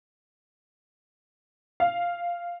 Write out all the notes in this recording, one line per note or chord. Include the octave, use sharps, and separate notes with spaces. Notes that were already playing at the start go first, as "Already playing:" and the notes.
F5